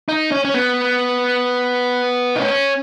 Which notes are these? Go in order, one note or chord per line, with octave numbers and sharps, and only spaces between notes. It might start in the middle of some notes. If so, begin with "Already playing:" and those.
D#4
C#4
C#4
B3
D#4
C#4